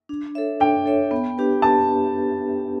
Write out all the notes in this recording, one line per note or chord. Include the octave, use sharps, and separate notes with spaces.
D4
A4 C#5 E5
D4 G5
A4 C#5 E5
B3
D4 G4 B4
B3 A5